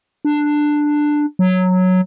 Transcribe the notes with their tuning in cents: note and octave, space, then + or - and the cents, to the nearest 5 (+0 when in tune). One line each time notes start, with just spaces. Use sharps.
D4 +10
F#3 -5